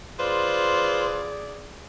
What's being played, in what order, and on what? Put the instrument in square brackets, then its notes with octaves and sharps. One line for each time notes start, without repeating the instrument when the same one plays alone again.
[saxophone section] F4 B4 C5 [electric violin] G#4 D5